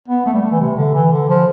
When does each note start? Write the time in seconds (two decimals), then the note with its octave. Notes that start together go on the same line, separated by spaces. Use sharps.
0.08 B3
0.26 A3
0.34 G3
0.43 A3
0.52 E3
0.60 C3
0.77 D3
0.95 E3
1.12 D3
1.29 F3